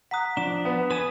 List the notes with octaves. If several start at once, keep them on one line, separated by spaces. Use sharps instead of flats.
F#5 A#5 D#6 F#6 B6
F3 D4 E7
B3
B4 G#5 D#6 E7